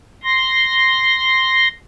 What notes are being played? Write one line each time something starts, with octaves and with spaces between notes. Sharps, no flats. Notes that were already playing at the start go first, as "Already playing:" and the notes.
C6 A#6